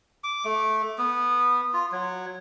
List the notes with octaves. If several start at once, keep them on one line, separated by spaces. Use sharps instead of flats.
D6
A3
B3
F4
F#3